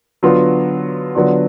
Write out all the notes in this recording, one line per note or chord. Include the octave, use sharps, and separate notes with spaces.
D3 F#3 B3 F4
D3 F#3 B3 D4 F4